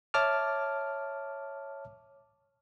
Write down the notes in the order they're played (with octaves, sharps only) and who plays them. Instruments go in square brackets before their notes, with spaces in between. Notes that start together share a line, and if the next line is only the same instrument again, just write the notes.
[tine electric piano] C#5 E5 A5 D6 F6